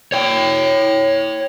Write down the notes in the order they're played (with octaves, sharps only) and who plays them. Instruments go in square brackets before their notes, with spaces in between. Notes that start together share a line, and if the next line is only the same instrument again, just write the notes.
[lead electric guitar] C#5 G5